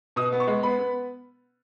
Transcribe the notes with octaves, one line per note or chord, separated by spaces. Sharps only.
B2 D#6
B3
C#6
G#3
B3 B5
B3